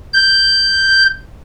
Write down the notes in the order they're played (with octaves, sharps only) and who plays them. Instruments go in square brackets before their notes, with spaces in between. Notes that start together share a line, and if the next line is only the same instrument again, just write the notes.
[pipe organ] G6